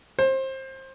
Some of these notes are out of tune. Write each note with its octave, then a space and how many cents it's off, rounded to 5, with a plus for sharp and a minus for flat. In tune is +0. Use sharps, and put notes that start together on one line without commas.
C5 +25